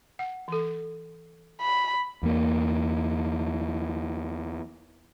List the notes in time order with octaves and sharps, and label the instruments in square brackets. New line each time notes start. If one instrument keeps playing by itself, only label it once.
[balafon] F#5
E3 A4
[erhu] B5
[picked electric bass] E2 A#3